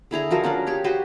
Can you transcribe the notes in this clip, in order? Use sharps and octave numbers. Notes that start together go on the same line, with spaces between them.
D3 E4 G#4 A#5
F3 F#3 A#4
F3 C#4 D4 D5
G4 G#4 C#5
F#4 G4 B4 C5